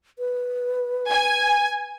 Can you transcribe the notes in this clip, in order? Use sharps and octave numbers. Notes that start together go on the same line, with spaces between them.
B4
G#5